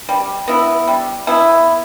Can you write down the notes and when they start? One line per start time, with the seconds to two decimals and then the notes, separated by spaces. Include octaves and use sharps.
0.09 G3
0.48 B3 E4
0.87 G3
1.27 B3 E4